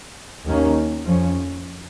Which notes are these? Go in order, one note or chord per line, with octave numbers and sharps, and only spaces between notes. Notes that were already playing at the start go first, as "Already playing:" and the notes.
D#2 D#3 A#3 C#4
F2 F3 C#4